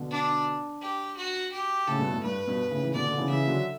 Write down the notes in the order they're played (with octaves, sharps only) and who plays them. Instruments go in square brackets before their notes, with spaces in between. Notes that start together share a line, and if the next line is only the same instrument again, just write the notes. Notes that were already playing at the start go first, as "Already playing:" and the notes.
Already playing: [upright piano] B2 D3
[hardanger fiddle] D4
G4
F#4
G4
[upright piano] A2 C#3 [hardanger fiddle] A4
[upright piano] G2 B2
A2
[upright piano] G2 [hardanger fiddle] B4
[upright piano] G2 B2
A2 C#3
C#3 E3
[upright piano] B2 D3 [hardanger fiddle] D5
[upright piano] B2 D3
C#3 E3
[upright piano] C#3 E3 [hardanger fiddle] E5
[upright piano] D3 F#3